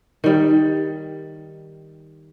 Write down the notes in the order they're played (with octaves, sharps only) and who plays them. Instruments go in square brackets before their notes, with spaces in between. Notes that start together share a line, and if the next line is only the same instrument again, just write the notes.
[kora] D#3 G3